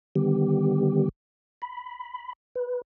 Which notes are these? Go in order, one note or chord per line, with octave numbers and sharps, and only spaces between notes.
D3 D#3 G3 B3 G4
B5
B4